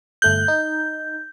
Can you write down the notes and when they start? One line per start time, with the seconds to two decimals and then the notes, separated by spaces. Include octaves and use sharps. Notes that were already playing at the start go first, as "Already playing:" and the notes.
0.22 G1 A3 F#6 G6
0.48 D#4